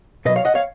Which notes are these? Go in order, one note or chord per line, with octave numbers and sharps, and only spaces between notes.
B2 F#3 B4 D#5
C#5 F5
D#5 F#5
C#5 F5